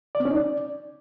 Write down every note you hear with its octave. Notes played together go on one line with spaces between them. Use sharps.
D5
C4
C#4
D#4
D5